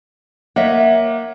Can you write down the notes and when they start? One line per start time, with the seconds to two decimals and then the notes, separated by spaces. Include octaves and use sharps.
0.56 A#3 C#5 D#5 E5 F#5